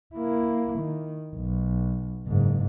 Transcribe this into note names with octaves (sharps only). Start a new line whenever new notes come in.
A#3 E4
D#3
B1
F#1 G#2